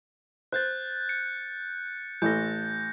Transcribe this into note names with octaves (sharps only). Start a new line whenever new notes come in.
C5 F#6 G6 A6
C#7
A1 A3 G6 A#6